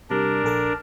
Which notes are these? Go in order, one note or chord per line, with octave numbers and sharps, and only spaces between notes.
C3 G3 D4 A#4
A#1 A4 A5